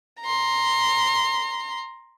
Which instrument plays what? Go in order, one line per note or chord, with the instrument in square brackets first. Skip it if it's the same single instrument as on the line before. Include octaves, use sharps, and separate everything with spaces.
[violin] A#5 C6